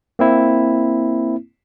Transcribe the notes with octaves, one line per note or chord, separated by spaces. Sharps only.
A#3 C4 E4